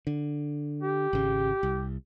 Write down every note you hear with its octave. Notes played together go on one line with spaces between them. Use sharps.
D3
G4
G#1 C#3
C2